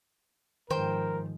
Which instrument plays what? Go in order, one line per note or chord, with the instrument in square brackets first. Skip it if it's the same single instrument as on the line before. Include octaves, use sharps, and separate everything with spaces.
[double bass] G#2 F3 [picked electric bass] D#3 [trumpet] A#4 [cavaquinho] C5 G5